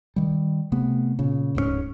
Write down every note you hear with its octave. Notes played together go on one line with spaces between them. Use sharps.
D#3 G3
C3 A3 B3
A#2 C#3
D1 G#2 A3 C#4